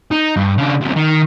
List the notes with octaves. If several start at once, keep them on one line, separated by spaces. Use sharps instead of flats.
D#4
G2
C#3 D4
D2 C3
D#3